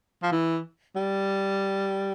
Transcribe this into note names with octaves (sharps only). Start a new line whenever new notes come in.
F3
E3
G3